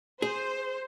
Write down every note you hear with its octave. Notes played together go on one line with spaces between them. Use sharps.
G#4 C5